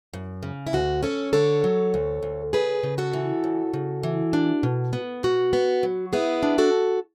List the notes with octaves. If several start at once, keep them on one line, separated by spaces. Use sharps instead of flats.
F#2
C#3
E4
D2 F#4
C#4 A4 C#5
D3 A4 C#5
F#3
D2
D2
C#3 G#4 B4
C#3
F#4 A4
E3
C#3
C#3
E3
D4
B2
B3
B2 F#4
B3
F#3
B3 E4 G#4
D4
F#4 A4